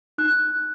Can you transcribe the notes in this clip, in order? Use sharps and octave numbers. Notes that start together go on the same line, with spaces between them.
D#4 F#6